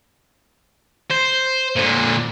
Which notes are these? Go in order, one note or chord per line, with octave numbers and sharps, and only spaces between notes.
C5
A#2 D3